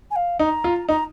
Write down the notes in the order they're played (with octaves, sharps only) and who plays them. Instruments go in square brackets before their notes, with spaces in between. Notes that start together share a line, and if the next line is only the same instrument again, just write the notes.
[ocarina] G#5
F5
[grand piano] D#4 [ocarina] A#5
[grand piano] F4
[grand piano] D#4 [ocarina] A#5